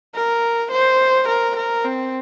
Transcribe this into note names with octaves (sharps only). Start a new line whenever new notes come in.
A#4
C5
A#4
A#4
C4